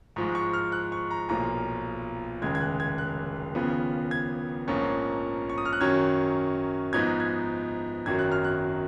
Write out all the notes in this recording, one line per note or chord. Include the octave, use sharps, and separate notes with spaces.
G#2 F3 G#3 C#6
C#6
F6
F#6
C#6
A#5
B1 A#2 F3 A#5
F1 D#2 C#3 G#3 G#6
G#6
F#6
G#6
F#6
D#2 C#3 F3 B3
G#6
A#1 G#2 F3 A#3 C#4
C#6
D#6
F6
F#6
F#2 D#3 F#3 C#4 G#6
G#2 F3 B3 D#4 G#6
G#6
G#1 F#2 D#3 F#3 G#6
F#6
F6
F#6